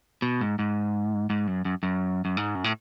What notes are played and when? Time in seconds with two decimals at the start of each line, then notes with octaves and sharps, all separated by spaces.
0.22 B2
0.41 G#2
0.59 G#2
1.30 G#2
1.47 F#2
1.65 F#2
1.83 F#2
2.25 F#2
2.37 G#2
2.55 F#2
2.64 A2